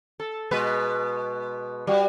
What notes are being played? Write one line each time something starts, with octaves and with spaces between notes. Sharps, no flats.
A4
B2 G#3 B4
G3 F#4